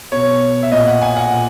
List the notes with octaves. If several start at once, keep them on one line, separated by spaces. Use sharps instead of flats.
B2 C#5
E5
A#2 D#5
F#5
G#5
F#5
A#2